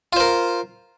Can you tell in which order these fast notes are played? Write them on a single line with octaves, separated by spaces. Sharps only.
F4 C5 A#4